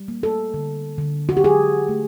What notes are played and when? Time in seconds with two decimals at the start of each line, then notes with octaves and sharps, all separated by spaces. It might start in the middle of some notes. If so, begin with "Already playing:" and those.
Already playing: G3
0.08 A#3
0.23 A4
0.54 D3
0.98 D3
1.29 F#4
1.37 G4
1.44 F#3 G#4
1.89 A3